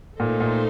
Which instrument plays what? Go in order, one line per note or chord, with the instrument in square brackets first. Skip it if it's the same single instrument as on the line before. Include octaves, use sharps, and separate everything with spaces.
[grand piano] A#2 [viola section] A3 D#4 A4 C5
[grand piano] A#2